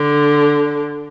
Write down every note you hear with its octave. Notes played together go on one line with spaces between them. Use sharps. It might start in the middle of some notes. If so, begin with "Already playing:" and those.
Already playing: D3